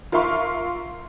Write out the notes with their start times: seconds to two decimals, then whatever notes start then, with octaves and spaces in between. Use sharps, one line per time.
0.12 F4 A#4 E5 F5 C6 C#6